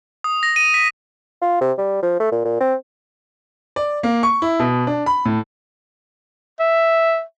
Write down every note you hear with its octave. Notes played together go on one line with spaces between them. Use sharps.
D#6
A#6
D#7
B6
F4
C3
G3
F3
A3
A#2
A#2
C4
D5
A#3
C#6
E4
B2
D4
B5
A2
E5